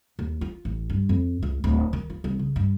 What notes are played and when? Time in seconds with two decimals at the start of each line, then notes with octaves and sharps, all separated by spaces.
0.19 D#2
0.41 F4
0.65 A1
0.90 G2
1.09 F2
1.43 C#2
1.64 D1
1.93 D#3
2.10 F4
2.24 C2
2.39 C#3
2.56 G2